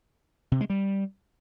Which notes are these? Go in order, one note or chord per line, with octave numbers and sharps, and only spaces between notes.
C3
G#3
G3